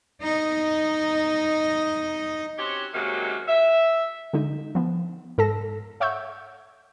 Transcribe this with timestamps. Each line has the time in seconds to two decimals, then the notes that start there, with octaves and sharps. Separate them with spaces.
0.22 D#4 D#5
2.58 C4 C#4 F#4 G4 C#5
2.93 F#2 C3 D#3 F#3 G#3 A#3
3.48 E5
4.33 D3 G#3 D#4
4.75 F3 B3
5.38 G#2 A4 A5 A#6
6.00 C#5 E5 F#5 C#6 E6 G6